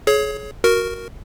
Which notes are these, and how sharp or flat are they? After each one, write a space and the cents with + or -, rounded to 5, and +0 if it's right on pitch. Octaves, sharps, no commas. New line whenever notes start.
G#4 +30 C#5 +0
F#4 +0 A#4 +0